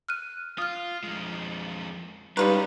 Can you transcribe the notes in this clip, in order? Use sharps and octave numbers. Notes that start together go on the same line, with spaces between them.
F6 F#6 D#7
F4 D#6 F6
F2 G#3
G3 G#3 C#4 D#4 F4 B4 A#5 C#6